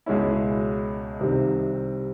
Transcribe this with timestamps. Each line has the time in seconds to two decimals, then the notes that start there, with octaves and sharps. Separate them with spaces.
0.06 C#2 B2 G#3 C#4 E4
1.20 C2 C3 D#3 G3 C4